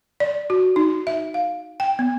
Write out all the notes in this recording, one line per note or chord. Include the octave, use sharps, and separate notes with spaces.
D5
F#4
D#4
E5
F5
G5
B3